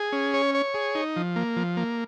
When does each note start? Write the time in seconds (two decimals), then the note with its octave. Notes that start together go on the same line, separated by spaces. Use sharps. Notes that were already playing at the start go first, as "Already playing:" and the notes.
Already playing: G#4
0.12 C#4
0.34 C#5
0.55 C#5
0.74 G#4
0.95 D#4
1.16 F3
1.36 A#3
1.56 F3
1.77 A#3